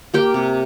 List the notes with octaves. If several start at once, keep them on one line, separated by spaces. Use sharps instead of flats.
A#3 G4 G5
C3